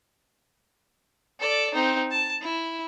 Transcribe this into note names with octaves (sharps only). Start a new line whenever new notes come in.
A4 D5
C4 D#4
A5
E4